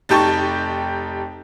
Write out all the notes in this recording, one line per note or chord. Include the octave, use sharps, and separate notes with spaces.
F1 D#4 G4 A5 C#6